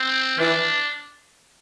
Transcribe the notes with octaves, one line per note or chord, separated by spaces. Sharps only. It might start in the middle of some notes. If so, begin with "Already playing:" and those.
Already playing: C4
E3 D4